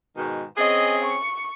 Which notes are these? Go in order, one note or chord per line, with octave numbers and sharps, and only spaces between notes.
G#2 B2 D#3
C4 C#4 G#4 D#5
C#6